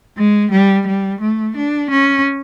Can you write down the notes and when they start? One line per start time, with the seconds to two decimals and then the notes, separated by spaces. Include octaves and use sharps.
0.18 G#3
0.51 G3
0.87 G3
1.21 A3
1.57 D4
1.90 C#4